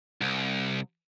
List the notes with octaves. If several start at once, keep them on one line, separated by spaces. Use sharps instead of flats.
C2